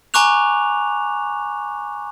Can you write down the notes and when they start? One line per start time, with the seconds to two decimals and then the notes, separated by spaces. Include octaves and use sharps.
0.14 G#5 A#5 C#6 D6 F#6 F7